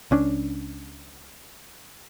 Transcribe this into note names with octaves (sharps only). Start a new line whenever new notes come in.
C#2 C#4 D4